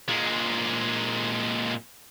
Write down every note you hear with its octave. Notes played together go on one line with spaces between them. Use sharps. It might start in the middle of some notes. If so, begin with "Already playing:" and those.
A#2 G#3